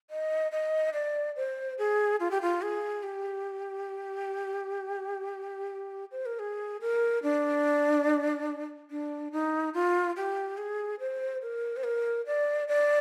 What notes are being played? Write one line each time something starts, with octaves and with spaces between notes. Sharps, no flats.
D#5
D#5
D5
C5
G#4
F4
G4
F4
G#4
G4
C5
A#4
G#4
A#4
D4
D4
D#4
F4
G4
G#4
C5
A#4
C5
A#4
D5
D5